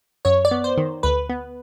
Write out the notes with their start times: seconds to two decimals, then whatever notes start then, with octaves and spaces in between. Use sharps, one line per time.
0.25 F#2 C#5
0.45 D5
0.51 B3
0.64 C5
0.77 D#3
1.03 D2 B4
1.29 B3